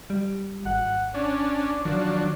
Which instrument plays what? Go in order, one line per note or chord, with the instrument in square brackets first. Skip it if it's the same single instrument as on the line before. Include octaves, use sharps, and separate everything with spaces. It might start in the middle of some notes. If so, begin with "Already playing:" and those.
[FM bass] G3
[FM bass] G#1 [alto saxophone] F#5
[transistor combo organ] C#4 D4 [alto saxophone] D5
[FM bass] D#3 [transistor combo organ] F3 F#3 D4